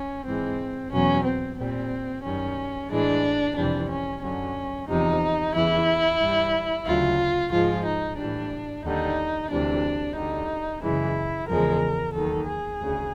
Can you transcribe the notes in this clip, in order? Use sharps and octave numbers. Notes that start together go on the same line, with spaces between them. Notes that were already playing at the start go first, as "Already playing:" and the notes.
Already playing: C#4
G#2 E3 G#3 C4
E2 B2 F#3 C#4
C4
A#2 G3 C4
F#2 D#3 G3 C#4
A2 E3 G#3 D4
F2 C3 E3 G3 D4
C#4
F#2 D3 F#3 C#4
E2 C3 F3 D#4
E2 C#3 E3 E4
G2 E3 G3
D2 C#3 F#3 F4
G#2 F3 G#3 F4
D#4
A2 E3 G3 D4
D#2 D3 G3 D#4
D2 C3 E3 D4
D2 D3 G3 D#4
F#2 C#3 E3 G#3 E4
E2 C#3 F3 G#3 A#4
D#2 D#3 F#3 A4
G#4
D2 C#3